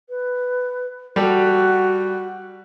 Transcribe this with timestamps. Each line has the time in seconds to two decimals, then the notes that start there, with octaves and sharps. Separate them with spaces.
0.09 B4
1.16 G3 F#4 G4 A4